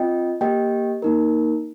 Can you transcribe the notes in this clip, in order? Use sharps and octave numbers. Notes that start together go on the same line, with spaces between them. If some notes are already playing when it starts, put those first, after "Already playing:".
Already playing: C4 F4 D#5 G5
A#3 G4 D#5 G5
A#3 D#4 A#4